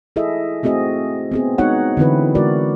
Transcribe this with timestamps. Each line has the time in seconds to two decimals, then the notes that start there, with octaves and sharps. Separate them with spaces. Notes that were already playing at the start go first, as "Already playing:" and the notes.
0.16 E4 G#4 A4 D#5 E5
0.63 A3 C4 F#4 G#4 D#5
1.32 B3 C4 G#4
1.58 G#3 B3 D#4 F#4 C#5 F#5
1.97 D3 E3 C4 E4 B4
2.35 G#3 F#4 A#4 D5